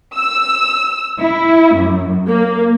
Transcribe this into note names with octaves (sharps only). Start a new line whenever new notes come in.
E6
E4
F#2
A#3